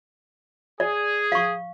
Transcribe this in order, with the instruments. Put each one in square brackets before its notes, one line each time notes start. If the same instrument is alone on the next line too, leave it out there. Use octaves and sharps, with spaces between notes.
[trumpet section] G#4 [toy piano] D5
[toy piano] F5 C#6